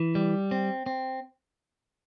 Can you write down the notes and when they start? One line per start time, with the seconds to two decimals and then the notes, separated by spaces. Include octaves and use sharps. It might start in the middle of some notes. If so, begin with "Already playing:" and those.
Already playing: E3
0.15 G3
0.51 C4
0.86 C4